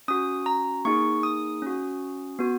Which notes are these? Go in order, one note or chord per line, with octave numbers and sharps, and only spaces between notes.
C#4 F#4 D#6
A#5
A#3 D#4 G#4 C#6
D#6
C#4 F#4
B3 F#4